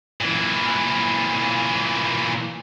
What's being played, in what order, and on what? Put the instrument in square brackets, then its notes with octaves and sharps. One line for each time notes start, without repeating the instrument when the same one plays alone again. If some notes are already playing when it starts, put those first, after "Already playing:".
[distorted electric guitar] A#2 E3